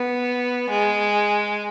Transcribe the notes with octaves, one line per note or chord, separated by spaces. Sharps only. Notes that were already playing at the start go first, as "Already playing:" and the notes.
Already playing: B3
G#3